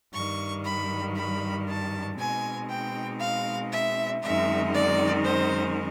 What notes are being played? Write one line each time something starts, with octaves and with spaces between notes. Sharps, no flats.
G2 D#3 G3 C#6
B5
B5
A5
B2 G#3 C4 D#4 G#5
G5
F5
E5
F#2 D#3 G#3 C4 D#4 E5
D5
C5